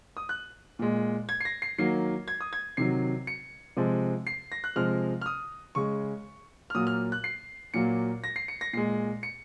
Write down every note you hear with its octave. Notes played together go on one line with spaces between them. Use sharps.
D#6
F#6
A#2 G#3
G#6
C7
A#6
C7
D#3 F#3 A#3 C7
G#6
D#6
G#6
C3 D#3 F#3 C7
C#7
C3 F3 G#3
C7
A#6
F#6
C3 F3 G#3 F6
F6
D#6
C#3 G#3 C#6
F6
A#2 F#3 A#3 D#6
F6
F#6
C7
A#2 F#3 A#3 C#7
A#6
C7
C#7
A#6
A#2 G#3 C7
C#7